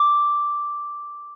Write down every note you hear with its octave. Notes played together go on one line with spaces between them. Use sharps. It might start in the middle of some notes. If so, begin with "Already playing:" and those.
Already playing: D6